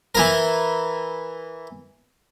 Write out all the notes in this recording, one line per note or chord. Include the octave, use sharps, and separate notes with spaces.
E3 E4 A#4